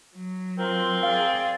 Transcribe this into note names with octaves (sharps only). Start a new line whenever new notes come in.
F#3
C4 F4 A#4 C5
G#4 D5 F5